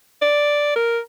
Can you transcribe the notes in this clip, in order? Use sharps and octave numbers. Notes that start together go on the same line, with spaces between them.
D5
A#4